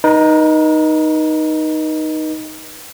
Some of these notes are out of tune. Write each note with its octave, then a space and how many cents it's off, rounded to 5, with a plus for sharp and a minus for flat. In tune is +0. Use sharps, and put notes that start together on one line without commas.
D#4 +0 B4 -45